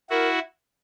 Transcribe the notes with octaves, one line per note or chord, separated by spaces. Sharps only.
E4 F#4 A#4